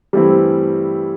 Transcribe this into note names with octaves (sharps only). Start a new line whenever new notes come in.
G2 E3 G3 A3 C4 E4